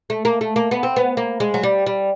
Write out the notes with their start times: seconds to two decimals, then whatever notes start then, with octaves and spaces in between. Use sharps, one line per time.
0.10 A3
0.25 A#3
0.41 A3
0.56 A#3
0.71 B3
0.83 C4
0.96 B3
1.17 A#3
1.40 G#3
1.54 F#3
1.63 G3
1.87 G3